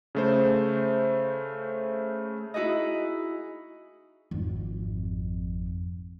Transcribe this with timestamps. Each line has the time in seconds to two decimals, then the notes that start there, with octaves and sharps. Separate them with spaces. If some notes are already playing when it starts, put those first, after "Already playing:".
0.15 C#3 A3 C5
2.54 D#4 E4 F#4 G#4 D#5
4.31 G#1 F2